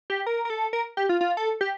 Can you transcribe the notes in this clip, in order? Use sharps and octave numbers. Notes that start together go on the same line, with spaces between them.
G4
A#4
A#4
A4
A#4
G4
F4
F4
A4
G4